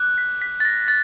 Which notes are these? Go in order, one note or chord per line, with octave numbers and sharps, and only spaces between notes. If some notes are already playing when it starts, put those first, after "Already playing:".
Already playing: D6 F#6
B6
B6
A6
A#6
A6